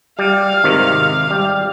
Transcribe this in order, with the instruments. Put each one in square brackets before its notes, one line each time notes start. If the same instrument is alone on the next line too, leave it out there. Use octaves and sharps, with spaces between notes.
[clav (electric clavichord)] G3 [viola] F5
[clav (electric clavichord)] G#1 C3 D#3
G3